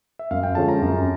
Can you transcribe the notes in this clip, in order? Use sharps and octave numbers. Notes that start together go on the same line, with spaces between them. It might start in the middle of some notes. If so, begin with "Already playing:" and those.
E5
F#2 F5
G5
D3 F3 G#3 C#4 A5
A#5
F#2